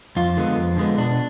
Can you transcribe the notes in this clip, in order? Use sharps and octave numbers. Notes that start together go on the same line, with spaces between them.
F2 F4
D3 G#3 B3
F2
D3 G#3 B3
B2 D4